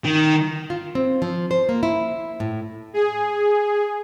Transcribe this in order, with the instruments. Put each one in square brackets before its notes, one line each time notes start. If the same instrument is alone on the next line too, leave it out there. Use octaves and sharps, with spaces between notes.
[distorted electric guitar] D#3
[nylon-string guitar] F4
C4
F3
C5
A#3
E4
A2
[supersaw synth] G#4